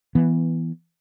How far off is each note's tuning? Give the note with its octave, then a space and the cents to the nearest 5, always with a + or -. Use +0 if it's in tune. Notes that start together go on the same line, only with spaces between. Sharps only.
E3 +0 B3 -10